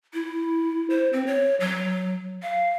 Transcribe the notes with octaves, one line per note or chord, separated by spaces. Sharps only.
E4
C5
C4
C#5
F#3
F5